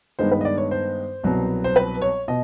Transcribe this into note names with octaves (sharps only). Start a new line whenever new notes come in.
G2 D#3 G#3 B3 D#4 C5
B4
D#5
D5
C#5
C5
C2 B2 F#3 B3
C5
B4
C#5
B2 D#5